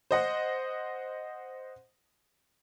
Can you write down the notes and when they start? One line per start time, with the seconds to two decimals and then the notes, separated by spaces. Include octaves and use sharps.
0.11 C5 D#5 F#5